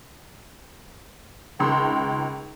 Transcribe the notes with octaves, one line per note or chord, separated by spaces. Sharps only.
G#1 C#2 C6